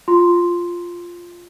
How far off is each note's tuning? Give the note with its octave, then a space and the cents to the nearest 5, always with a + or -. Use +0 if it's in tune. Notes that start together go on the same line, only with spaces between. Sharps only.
F4 +0 C6 +0